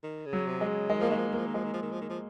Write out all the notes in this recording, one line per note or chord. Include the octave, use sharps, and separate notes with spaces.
D#3
C#3
F#3
C3
G#3
C#3
D#3 G#3
F3 A#3
D#3 G#3
F3
D#3
F3 A#3
D#3
F3 G#3
D#3
F3
D#3
F3
D#3
F3